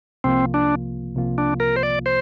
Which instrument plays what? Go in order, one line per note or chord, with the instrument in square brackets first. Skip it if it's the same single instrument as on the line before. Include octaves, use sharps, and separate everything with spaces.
[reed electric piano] C2 C3 F3 A#3 F4 [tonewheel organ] C4
[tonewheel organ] D4
[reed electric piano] C2 C3 F3 A#3 F4
[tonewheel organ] D4
A#4
C5
D5
C5